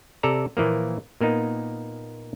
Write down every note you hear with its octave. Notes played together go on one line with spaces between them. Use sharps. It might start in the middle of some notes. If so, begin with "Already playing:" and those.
C3 A4 D5 A#5
A#2 E3 F3 A#3
A#2 A#3 B3 D#4